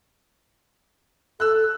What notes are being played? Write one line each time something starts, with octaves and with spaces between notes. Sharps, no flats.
A4 E6 F#6